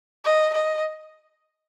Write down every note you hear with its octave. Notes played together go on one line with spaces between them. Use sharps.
D#5
D#5